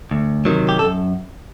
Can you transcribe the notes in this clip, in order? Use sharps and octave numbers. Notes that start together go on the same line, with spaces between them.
D2
C3 D#3 F#3
G4
F#2 A4